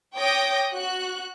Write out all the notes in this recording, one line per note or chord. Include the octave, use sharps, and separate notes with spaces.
C#5 G5 D6 D#6 G6 A#6
F#4 F#6